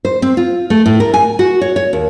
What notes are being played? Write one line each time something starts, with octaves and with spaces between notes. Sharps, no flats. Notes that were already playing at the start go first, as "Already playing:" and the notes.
C5
C4
F4
A3
A2
A#4
G#5
F#4
C#5
C#5
D#2